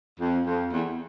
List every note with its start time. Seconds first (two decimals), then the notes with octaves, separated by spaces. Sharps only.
0.20 F2
0.46 F2
0.72 E2